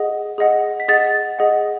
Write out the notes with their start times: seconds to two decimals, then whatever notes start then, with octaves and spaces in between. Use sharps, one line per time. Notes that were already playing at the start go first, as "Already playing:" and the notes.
Already playing: G#4 D#5 F#5
0.38 G#4 D#5 F#5
0.80 B6
0.88 G#4 D#5 F#5 A6
1.39 G#4 D#5 F#5